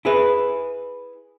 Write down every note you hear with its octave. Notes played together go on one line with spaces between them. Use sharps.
E4 G#4 B4